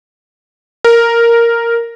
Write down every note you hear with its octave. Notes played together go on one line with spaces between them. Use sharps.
A#4